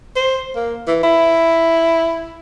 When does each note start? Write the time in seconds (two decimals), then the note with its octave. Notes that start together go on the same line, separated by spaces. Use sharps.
0.16 C5
0.56 A#3
0.87 E3
1.03 E4